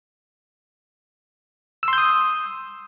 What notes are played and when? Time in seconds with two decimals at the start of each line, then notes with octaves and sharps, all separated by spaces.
1.83 E6
1.88 C6
1.93 G6
1.98 D#6